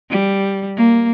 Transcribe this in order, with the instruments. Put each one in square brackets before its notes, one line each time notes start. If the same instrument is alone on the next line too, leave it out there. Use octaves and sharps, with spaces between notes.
[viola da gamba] G3
A#3